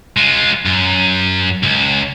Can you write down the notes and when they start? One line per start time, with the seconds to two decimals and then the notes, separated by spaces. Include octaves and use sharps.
0.17 G#3 F4
0.65 F#2
1.63 C#2